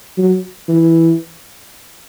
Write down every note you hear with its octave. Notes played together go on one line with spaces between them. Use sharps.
F#3
E3